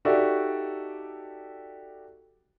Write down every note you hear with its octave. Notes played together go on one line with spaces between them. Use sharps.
D#4 F#4 G4 A4 D5 E5